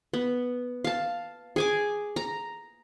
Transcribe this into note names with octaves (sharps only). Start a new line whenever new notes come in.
B3
F5 A5
G#4 G#5 D6
A#5